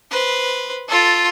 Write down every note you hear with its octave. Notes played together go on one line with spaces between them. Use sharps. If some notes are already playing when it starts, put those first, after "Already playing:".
B4 C5
F4 A4